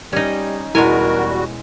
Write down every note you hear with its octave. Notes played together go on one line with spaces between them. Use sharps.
G3 C#4 D#4
E2 B2 G3 G#3 E4 F#4 A#4 G#5